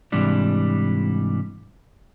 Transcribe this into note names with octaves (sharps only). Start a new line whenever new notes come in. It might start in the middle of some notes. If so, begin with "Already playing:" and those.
G#2 C3 E3 G3 D4